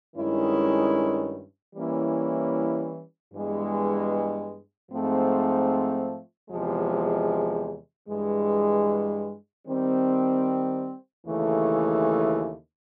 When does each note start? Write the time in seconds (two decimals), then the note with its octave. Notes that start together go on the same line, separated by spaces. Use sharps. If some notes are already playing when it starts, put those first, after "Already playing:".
0.16 G2 D#3 G#3 C#4 E4
1.75 E3 G3 A#3 C#4 E4
3.33 G2 E3 G#3 B3
4.92 G#2 F3 A3 C4
6.50 E2 C3 F3 G#3
8.08 G2 E3 G#3
9.67 D#3 G3 C4
11.26 D#2 C#3 E3 A3